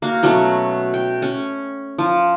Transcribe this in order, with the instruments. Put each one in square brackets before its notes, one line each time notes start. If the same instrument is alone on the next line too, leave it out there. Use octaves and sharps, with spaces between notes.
[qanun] A#3 F#4
B2 F#3 A3 C#4
G5
C#4
F3